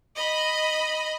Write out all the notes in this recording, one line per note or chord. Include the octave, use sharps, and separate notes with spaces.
D#5 B5